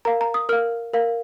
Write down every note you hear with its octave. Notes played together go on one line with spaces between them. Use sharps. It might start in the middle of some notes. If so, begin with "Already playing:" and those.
A#4 F5 A#5
A#5
D#6
A#4 F5 F6
A#4 F5